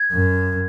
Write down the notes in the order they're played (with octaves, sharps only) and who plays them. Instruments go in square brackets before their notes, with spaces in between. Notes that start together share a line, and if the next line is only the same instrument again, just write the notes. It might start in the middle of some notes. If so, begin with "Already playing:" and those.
Already playing: [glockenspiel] G#6
[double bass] F#2